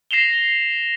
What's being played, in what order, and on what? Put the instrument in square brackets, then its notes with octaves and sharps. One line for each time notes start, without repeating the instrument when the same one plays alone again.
[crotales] A#6 C7 E7 F7 G7